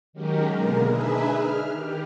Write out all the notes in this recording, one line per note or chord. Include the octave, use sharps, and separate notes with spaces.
D#3 F#3 G#3 C#4 G4 A#4
B2 D3 G#3 A#3 A#4
D4 D#4 G#4 B4 E5
F6
D#3 G4